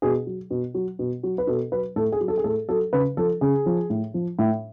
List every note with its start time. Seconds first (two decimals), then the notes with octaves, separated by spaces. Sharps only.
0.02 B2 G#4
0.27 F#3
0.51 B2
0.74 F#3
0.99 B2
1.23 F#3
1.38 B4
1.47 B2 A4
1.72 F#3 B4
1.96 A2 A4
2.12 G#4
2.20 F#3
2.28 A4
2.37 G#4
2.44 A2 A4
2.69 F#3 A4
2.93 C#3 B4
3.17 F3 A4
3.41 C#3 G#4
3.66 F3
3.90 A2
4.14 F3
4.39 A2